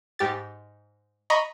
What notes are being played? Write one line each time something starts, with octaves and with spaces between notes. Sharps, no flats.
G#2 G4 A6
D#5 A#5 B5 C#6